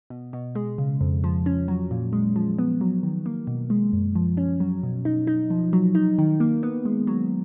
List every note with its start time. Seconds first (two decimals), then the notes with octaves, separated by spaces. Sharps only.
0.10 B2
0.33 B2
0.55 G#3
0.78 C#3
1.01 F2
1.24 F3
1.46 C#4
1.68 F#3
1.91 A#2
2.13 G#3
2.36 F3
2.58 B3
2.81 F#3
3.03 D#3
3.26 A#3
3.47 B2
3.70 G#3
3.93 F#2
4.15 F3
4.37 C#4
4.60 F#3
4.83 B2
5.05 D#4
5.27 D#4
5.50 F3
5.73 F#3
5.95 D#4
6.18 D#3
6.40 A#3
6.63 B3
6.85 G#3
7.07 F#3